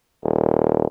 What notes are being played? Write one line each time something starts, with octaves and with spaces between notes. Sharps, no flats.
D#1